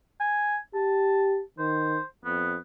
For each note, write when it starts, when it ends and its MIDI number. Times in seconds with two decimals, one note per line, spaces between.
0.20 0.57 80
0.75 1.41 67
0.75 1.41 81
1.59 1.99 51
1.59 2.03 72
2.25 2.57 41
2.25 2.56 59